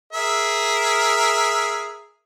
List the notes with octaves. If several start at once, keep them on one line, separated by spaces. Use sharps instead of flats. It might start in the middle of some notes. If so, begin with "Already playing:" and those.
G#4 A#4 E5